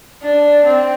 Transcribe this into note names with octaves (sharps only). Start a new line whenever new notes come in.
D4
C4